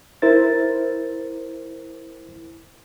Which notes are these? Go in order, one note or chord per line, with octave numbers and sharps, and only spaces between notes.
E4 A#4 C5 A6